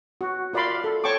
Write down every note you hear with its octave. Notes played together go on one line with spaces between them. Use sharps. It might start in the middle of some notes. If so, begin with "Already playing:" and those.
F#4
F4 A#4 D5 F5 B5 C6
A4
C#5 G5 A5 C#6 D6